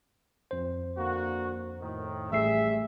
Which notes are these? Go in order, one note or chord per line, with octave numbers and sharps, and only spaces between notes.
F2 C5
D3 A#3 F#4
A2 D#3
A1 G3 A3 G#4 E5 C7